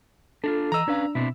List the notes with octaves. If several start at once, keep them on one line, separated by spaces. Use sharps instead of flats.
D4 D#4 F4 A4
E3 D#5 A#5 E6
C#4 D4 B4 F5
B2 C4 D4 E4